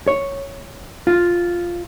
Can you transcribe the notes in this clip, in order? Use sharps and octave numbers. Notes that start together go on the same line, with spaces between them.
C#5
F4